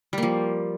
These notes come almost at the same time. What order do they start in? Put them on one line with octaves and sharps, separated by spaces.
G3 A#3 F3